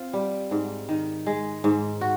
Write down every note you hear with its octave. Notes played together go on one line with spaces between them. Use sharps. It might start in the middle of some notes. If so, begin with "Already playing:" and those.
Already playing: C4 F4
G3
G#2
D#3
G#3
G#2
F#4